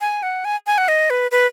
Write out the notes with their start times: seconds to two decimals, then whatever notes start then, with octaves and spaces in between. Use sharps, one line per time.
0.01 G#5
0.23 F#5
0.45 G#5
0.67 G#5
0.78 F#5
0.88 D#5
1.10 B4
1.31 B4